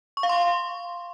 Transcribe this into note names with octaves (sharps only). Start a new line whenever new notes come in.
C#6
F5
C6